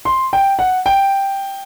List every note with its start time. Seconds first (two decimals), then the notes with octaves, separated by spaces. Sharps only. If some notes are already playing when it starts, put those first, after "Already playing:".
0.05 C6
0.33 G5
0.59 F#5
0.86 G5